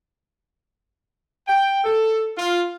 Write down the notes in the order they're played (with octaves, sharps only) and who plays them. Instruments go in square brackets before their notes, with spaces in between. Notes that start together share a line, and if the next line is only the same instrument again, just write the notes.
[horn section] G5
A4
F4